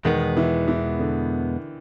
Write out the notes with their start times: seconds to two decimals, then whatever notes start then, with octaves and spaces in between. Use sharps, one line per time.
0.05 E2 B2 D#3 G#3 B3
0.37 E3
0.68 E3
0.99 D3